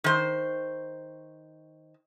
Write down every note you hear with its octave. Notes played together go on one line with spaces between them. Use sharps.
D#3 C5